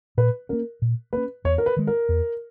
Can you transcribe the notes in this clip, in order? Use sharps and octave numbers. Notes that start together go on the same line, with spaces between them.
A#2 B4
A#3 C#4 A#4
A#2
A#3 C#4 B4
E2 C#5
A#4
B4
D#3 G#3
A#4
E2